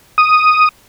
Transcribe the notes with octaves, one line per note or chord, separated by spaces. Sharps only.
D#6